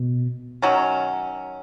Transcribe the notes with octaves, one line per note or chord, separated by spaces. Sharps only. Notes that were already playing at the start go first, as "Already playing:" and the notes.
Already playing: B2
D#3 F#3 C#4